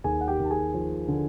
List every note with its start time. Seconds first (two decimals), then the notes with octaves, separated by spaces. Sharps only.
0.04 D#2 G#4 G#5
0.21 F#5
0.28 G4 G5
0.39 D#2
0.44 A5
0.51 G#4 G#5
0.74 F3
1.08 D3